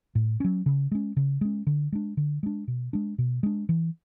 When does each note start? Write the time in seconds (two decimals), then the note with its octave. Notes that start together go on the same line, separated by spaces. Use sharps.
0.15 A2
0.40 F#3 C#4
0.66 C#3
0.91 G#3 C#4
1.17 C#3
1.41 G#3 C#4
1.67 D3
1.92 G#3 D4
2.17 D3
2.43 G#3 D4
2.68 B2
2.93 G#3 D4
3.18 B2
3.43 G#3 D4
3.69 E3